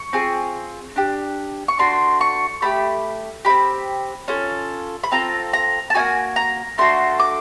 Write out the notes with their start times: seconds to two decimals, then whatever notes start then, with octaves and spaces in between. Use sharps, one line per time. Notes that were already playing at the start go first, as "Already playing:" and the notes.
Already playing: C#6
0.13 C4 F4 G#4
0.96 D4 G4
1.68 C#6
1.79 A3 D4 F#4 C6
2.21 C#6
2.62 A3 D4 G4 B5
3.45 D#4 G4 B5
3.50 C4
4.28 C#4 F4 A4
5.04 B5
5.12 C4 F4 A4 A#5
5.53 A#5
5.90 A5
5.94 A#3 D#4 F#4 G#5
6.36 A#5
6.78 A3 D4 F#4 A4 C6
7.20 D6